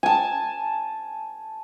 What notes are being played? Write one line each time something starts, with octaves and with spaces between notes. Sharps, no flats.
G#5 A5